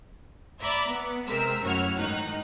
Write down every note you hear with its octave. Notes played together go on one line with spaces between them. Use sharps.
D5 E5 A#5 B5 D6
B3
C3 G#3 C4 A#4 E6 B6
F#2 A2 E4 F#4 C#5 F6
G#2 D#3 D#4 F#6